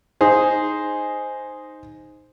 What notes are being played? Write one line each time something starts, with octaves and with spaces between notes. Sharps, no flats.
D#4 G#4 C5